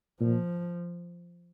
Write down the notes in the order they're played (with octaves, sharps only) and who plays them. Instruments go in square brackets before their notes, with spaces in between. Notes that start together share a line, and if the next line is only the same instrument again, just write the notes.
[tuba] A#2 [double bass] F3